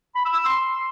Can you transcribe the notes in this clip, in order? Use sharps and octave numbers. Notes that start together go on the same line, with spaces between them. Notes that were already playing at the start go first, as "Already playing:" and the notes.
B5
E6
E6
C6